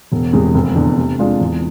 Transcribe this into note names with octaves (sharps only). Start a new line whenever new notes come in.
E1
E2 C3 G#3
F1
E2 D3
C3
G#3 D4 F4
E2